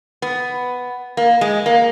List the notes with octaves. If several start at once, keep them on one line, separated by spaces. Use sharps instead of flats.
B3
A#3
G#3
A#3